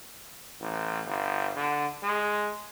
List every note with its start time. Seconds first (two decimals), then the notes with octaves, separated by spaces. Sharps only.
0.61 A1
1.06 G1
1.56 D3
2.03 G#3